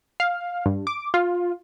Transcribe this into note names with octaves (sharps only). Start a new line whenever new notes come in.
F5
G2
D6
F4